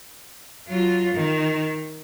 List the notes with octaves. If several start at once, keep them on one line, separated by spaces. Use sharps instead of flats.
F#3 F4
D#3